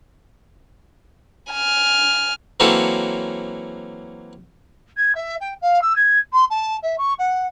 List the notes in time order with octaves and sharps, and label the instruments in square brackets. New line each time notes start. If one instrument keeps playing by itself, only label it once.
[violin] G#5 F6
[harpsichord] E3 F#3 A#3 C4 C#4 A4
[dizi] G#6
E5
G5
F5
E6
G#6
C6
A5
E5
C#6
F#5